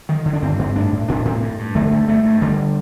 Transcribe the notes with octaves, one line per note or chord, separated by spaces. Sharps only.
D3 D#3
D3
D4
G2 C4
G2
A2 D4
A2
A2 D4
A2 C4
G2
G2
D3 A3
G2
G2 A3
G2
D3 G3